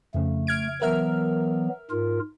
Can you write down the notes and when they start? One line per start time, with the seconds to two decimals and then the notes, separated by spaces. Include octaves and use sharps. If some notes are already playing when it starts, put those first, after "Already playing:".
0.14 F2 C#3 A3
0.47 F6 G#6 D7
0.82 E3 F#3 B3 A#4 E5 F6
1.90 G#2 F4 A#4